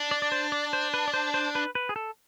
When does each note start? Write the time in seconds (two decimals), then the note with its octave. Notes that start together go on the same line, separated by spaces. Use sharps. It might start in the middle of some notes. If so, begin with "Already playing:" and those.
Already playing: D4
0.11 D5
0.22 D5
0.32 C5
0.52 D5
0.73 C5
0.94 B4
1.08 D5
1.14 C5
1.34 C5
1.55 B4
1.75 B4
1.89 G#4
1.96 A4